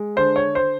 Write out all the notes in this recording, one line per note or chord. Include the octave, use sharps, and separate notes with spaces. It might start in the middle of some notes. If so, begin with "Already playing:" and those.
Already playing: G#3
D3 C5
C#5
C5